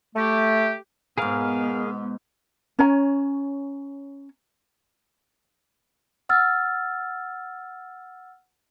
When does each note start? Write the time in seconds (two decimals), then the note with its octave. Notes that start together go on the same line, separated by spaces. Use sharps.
0.16 A3 G4
1.18 G#2 B2 B3 G#4 A#4 F5
2.79 C#4 C#5 G#5 A#5
6.29 F#5 E6 F6 A6